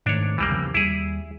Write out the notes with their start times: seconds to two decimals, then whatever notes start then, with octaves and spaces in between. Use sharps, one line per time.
0.06 G#2 D#3 A3 D4 C#5
0.38 C2 F2 E3 G3 A#3
0.50 E2 C#3 F3
0.74 D#2 G3 E4 G#4